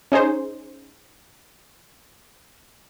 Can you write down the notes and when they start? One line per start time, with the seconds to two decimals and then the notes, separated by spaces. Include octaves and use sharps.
0.12 C#4 D#4 G#4 C5